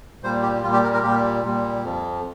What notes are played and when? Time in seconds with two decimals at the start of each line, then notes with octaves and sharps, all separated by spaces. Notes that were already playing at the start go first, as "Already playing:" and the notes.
0.23 A#2 G3 C5
0.43 G4
0.63 A#2 G3 F4
0.73 G4
0.84 A#4
0.94 A#4
1.03 A#2 G3 G4
1.44 A#2 G3
1.84 F2 F3